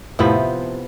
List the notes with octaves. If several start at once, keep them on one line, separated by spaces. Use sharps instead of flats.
A2 C3 F3 B3 E4